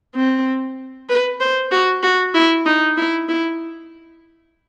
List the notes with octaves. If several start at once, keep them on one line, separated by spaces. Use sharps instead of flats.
C4
B4
C5
F#4
F#4
E4
D#4
E4
E4